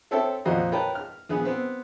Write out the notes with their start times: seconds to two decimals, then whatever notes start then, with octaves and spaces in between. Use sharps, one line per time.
0.11 C4 A4 C#5 E5 G5 A5
0.45 F2 A#2 F#4 C5 D#5
0.72 A#4 B4 C#5 G5 A5
0.95 F6
1.29 A#1 B3 G#4
1.45 B3 C4